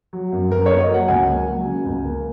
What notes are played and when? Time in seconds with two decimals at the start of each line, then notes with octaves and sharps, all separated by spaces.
0.13 F#3
0.32 F#2
0.50 F#2 A#4
0.66 A#3 C#5
0.80 D#5
0.89 F#3 F#5
1.08 C#2 G#5
1.28 A#3
1.47 F#3
1.65 C#3
1.85 C#2
2.05 A#3